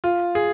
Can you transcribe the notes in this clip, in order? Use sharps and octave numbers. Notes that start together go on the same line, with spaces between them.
F4
G#4